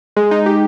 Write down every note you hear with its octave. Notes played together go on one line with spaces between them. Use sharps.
G#3
D#4
G4